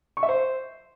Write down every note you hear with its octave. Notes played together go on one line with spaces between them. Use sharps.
C#6
E5
C5